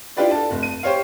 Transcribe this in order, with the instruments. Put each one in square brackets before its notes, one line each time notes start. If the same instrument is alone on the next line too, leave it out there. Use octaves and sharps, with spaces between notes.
[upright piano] D4 E4 F4 G4 B4 D5
A4 A5
F1
D#7
G4 C5 C#5 F5